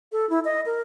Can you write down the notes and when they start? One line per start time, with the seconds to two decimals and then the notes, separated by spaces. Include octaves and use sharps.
0.12 A4
0.30 E4
0.45 D#5
0.66 A#4